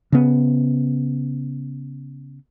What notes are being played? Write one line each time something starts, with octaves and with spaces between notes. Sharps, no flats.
C#3 B3